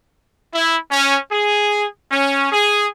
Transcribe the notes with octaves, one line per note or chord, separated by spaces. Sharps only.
E4
C#4
G#4
C#4
G#4